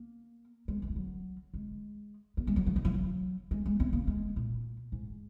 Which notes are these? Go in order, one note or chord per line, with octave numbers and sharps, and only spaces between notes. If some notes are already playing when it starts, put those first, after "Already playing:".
Already playing: A#3
G#3
G#3
F3
F#3
G#3
A#3
G#3
F#3
F3
D#3
F3
F#3
G#3
G#3
C4
A#3
G#3
A#2
G#2